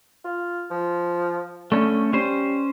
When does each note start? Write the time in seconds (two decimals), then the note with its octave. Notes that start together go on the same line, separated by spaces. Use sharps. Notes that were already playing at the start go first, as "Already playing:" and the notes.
0.25 F4
0.71 F3
1.72 D3 A3 C#4
2.13 G3 C#4 C5